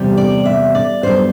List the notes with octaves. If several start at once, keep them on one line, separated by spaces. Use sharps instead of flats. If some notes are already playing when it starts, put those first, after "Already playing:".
Already playing: E2 C3 G3
D5
E5
D5
G2 F#3 B3 C5